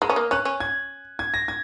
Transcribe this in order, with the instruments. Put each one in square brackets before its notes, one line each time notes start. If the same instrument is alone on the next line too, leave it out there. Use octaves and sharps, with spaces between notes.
[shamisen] G#3 [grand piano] D#6
[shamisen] C#4
A#3
[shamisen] C#4 [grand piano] F#6
[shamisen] C#4
[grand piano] G#6
G#6
A#6
G#6